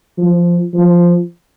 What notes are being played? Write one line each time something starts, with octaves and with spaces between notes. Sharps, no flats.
F3
F3